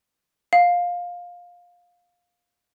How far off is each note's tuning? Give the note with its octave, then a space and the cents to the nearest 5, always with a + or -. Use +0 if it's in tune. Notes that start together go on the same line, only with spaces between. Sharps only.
F5 +15